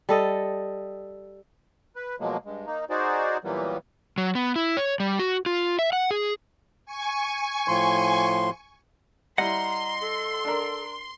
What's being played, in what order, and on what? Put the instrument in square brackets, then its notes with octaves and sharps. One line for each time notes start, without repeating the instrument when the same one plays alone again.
[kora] G3 A4 D#5
[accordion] B4
B2 F3 F#3 G#3 A#3
G2 G#3
A#3 D#4
D#4 F#4 G#4 C5 D5
A#2 E3 F#3 G3 A#3 B3
[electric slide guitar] F#3
B3
E4
C#5
G3
F#4
F4
E5
F#5
G#4
[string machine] G#5 C#6
[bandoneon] A2 F3 C6
[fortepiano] G3 E4 [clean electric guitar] D#5 F#5 [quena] A#5 [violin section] C6
[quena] A4
[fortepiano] D4 A#4